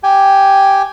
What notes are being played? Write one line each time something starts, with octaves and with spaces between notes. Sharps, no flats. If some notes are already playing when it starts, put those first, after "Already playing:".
G4 G5 G#5